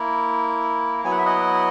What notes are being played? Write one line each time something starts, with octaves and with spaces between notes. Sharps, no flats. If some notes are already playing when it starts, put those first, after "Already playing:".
Already playing: A#3 E4
F#3 B3 E4 G#5
F#5
E5
D#5 F#5